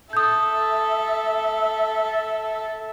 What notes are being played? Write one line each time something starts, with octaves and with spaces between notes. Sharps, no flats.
A4 E5 D#6 G6